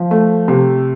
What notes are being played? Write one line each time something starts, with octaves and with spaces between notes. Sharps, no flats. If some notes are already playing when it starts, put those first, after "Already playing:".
Already playing: F3
A3
C3